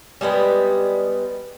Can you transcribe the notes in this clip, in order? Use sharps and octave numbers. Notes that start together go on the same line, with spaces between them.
G3 G#3 A#3 B3